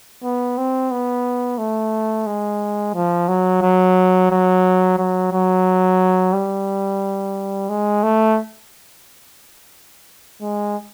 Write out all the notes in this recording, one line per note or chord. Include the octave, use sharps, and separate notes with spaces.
B3
C4
B3
A3
G#3
F3
F#3
F#3
F#3
F#3
F#3
G3
G#3
A3
G#3